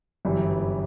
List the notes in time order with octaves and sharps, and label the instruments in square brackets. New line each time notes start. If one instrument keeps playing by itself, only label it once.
[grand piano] G1 F#2 E3 G3